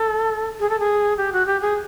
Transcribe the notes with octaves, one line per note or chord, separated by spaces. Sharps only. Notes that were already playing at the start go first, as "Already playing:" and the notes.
Already playing: A4
G#4
A4
G#4
G4
F#4
G4
G#4